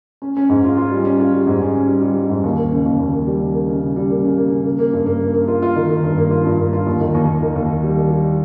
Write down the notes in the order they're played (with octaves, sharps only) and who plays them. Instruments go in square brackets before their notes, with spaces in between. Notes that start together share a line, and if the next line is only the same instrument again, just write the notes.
[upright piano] C#4
C#4
G#2
F4
F4
G3
C#4
F4
G3
G#2
C#4
C#4
G3
G3
C#4
G#2
D#2
A#3
C#3
D#2
D#2
A#3
G3
C#3
A#3
C#3
C#3
G3
A#3
C#3
A#3
C#3
A#3
A#3
G2
A#3
A#3
A#3
F4
F4
D#3
D#3
G2
A#3
F4
G2
A#3
F4
D#2
D#3
D#2
D#2
D#3
D#2
D#3
G3
D#3
G3